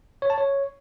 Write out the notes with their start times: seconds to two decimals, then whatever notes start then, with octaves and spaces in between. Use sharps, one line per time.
0.22 C#5
0.30 A5
0.38 C#5